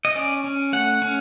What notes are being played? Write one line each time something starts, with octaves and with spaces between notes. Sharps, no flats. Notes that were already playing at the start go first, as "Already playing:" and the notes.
D#5
C#4 D5
C#4
A3 F#5
C#4